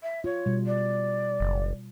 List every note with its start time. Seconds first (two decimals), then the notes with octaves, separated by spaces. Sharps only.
0.03 E5
0.24 F4 C#5
0.46 B2 G3
0.65 D5
1.40 F#1